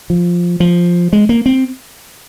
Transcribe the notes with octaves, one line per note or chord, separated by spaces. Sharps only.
F3
F3
G#3
A#3
C4